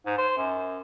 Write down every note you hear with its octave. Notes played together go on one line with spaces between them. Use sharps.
G#2
C5
F#2